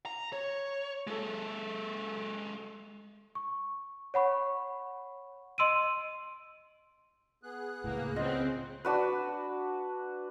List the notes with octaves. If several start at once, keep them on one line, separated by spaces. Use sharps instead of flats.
A#5
C#5
G#3 A4
C#6
C#5 F#5 B5 C#6
D#5 C6 E6 D7 D#7
B3 G#4 F#6
C#2 A2 A#3
C#3 C4 F4 D#5
D4 F#4 B4